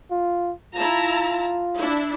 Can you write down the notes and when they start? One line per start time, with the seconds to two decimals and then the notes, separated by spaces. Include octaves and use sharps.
0.11 F4
0.75 E4 F4 A5 A#5
1.76 D4 E4